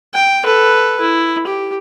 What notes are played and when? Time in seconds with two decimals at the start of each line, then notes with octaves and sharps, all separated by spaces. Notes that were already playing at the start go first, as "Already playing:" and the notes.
0.14 G5
0.44 A4 B4
1.00 E4
1.47 G4